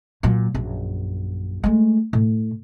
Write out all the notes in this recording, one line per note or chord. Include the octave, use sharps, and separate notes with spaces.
A#2 F#3
A#1 F#2
G#3 A3
A2